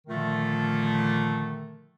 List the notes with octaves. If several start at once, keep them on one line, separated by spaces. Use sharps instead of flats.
A#2 D3 D#3 F3 A3